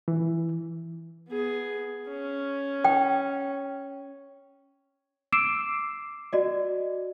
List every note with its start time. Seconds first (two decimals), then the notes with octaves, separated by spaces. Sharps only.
0.08 E3
1.29 B3 G#4
2.09 C#4
2.85 G5
5.32 D6 E6 C7 D7 E7
6.33 F#4 D5 D#5